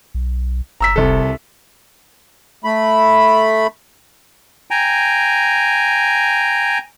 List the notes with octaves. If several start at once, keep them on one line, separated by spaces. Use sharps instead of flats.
B1
G1 A#5 E6 B6
F1 C2 A4
A3 B5
G5 G#5 A#5